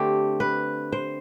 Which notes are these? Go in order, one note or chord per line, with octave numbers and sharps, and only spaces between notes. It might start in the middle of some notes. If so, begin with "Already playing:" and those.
Already playing: D3 A3 C4 G4
B4
C5